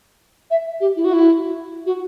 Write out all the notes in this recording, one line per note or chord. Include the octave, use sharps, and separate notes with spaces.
E5
G4
E4
F#4
E4
F#4